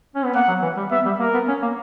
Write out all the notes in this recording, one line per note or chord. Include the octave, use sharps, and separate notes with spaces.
C#4
B3
A#3 F#5
F#3
E3
G3
B3 E5
G3
A#3 A#4
B3
C#4
A#3